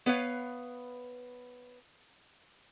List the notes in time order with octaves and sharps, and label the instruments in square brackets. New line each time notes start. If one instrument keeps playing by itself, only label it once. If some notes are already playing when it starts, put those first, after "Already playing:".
[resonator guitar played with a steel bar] B3 B4 C#5 F5